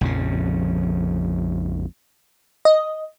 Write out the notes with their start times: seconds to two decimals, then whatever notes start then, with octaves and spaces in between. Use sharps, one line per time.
0.01 A#1 F2 C#3
2.65 D#5